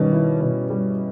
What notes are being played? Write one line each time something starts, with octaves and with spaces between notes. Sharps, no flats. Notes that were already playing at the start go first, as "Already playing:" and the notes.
Already playing: B2 D#3 G3 C#4
E4
B2
G3